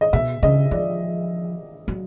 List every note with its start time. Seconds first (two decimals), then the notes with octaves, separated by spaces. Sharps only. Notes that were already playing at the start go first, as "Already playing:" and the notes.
0.01 D#5
0.13 B2 E5
0.43 C#3 D#5
0.71 F3 D5
1.88 F#3